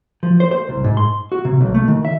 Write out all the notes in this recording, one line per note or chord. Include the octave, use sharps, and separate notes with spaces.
F3
C5
C5
C2
G#2
C6
F#4
C3
B1
A3
D#3
E5